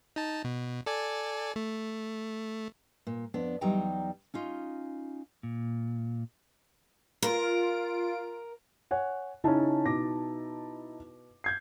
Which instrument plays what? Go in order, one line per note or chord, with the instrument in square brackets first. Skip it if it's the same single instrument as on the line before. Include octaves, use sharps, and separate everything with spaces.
[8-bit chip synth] D#4 A5
B2
A4 D5 G#5
A3
[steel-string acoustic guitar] A#2
F2 B3 D4
E2 F#3 G3 D#4 G5 A#5
C#4 D#4 F4
[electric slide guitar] A#2
[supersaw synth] F4 D7 [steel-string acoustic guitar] A#4
[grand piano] C#5 F#5 G#5
[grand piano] C#3 C#4 [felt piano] D#4 E4 A5
[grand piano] B2 D6 A#6
G6 G#6 C7